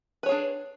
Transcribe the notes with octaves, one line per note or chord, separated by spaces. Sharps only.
D4 G#4 B4 C#5